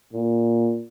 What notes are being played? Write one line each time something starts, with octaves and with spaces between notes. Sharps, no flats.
A#2